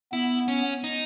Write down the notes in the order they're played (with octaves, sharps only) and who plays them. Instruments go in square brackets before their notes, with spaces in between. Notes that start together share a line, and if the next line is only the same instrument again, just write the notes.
[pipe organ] B3 [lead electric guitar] E4
[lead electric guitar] C#4
D#4